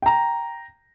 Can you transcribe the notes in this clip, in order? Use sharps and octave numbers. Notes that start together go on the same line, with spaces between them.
G5 A#5